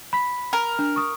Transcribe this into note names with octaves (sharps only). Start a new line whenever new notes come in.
B5 B6
A#4
D4
C#6 D#6